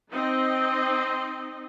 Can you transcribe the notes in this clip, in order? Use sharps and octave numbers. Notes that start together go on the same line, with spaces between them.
C4 D#4 D#5